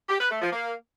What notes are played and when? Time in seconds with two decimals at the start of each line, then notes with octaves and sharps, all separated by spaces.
0.09 G4
0.20 B4
0.31 A3
0.42 F3
0.52 A#3